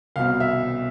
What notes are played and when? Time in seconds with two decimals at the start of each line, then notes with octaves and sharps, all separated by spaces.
0.16 C2 B2 F5
0.40 E5